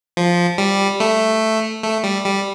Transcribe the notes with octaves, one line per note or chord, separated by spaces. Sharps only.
F3
G3
A3
A3
G3
G3